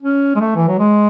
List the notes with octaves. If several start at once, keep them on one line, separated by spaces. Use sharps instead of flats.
C#4
G#3
A3
E3
F#3
G#3